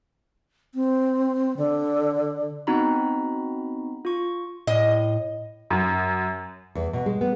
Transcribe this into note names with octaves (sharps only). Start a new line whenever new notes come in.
C4
D3
B3 C4 D#4 F#4 A#5 B5
F4 C#6
A2 D#5
F#2
E2
B2
G#3
B3